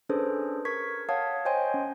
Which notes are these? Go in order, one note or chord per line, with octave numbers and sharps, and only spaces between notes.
C#4 D4 G#4 A4 B4 C5
A#4 C#6 G#6 B6
C#5 F5 F#5 A5 D#6 G#6
C5 C#5 D#5 G5 G#5 C6
C#4